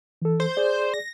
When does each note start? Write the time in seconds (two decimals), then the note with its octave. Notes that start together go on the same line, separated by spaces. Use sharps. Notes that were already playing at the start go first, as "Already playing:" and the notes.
0.22 E3 A4
0.40 C5
0.57 G#4 D5
0.94 A#6